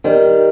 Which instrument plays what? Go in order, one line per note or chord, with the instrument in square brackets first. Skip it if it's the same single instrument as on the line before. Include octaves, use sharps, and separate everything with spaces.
[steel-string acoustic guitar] D#3 G3